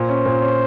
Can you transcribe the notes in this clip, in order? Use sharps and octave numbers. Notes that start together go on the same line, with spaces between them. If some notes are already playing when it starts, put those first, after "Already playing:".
Already playing: A#2 C5
C#4
A#2
C#4